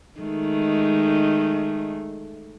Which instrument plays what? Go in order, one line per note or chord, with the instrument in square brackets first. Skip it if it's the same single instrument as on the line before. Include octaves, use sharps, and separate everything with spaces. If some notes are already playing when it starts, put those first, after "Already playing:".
[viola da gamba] D#3 G#3 A3